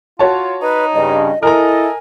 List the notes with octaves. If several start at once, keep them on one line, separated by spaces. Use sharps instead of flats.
F4 F#4 C#5 A5
D#4 B4
G2 C#3 D#5
E4 A4 A#4 D#5 G#5 A#5